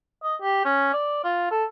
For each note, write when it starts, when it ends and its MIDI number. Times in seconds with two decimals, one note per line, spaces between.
0.23 0.35 75
0.42 0.63 67
0.65 0.91 61
0.93 1.20 74
1.24 1.48 65
1.51 1.64 69